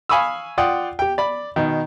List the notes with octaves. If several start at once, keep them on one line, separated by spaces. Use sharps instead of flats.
F5 G#5 B5 C#6 D#6 E6
F4 D5 F#5 G5 D#6
G4 G5
D5 B5
B2 D#3